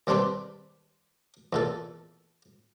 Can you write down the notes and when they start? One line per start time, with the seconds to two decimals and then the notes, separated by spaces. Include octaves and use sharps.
0.07 D#2 G3 C4 D4 G4 B4
1.53 E2 A#2 A4